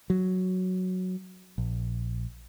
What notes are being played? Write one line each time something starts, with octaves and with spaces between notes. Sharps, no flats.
F#3
A#1